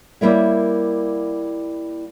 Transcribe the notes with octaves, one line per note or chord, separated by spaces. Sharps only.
G3 A#3 E4 A#4 C#5 E5